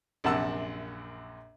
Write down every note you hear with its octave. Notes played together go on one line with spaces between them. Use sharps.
A#1 F#2 C3 F#5 A5 E6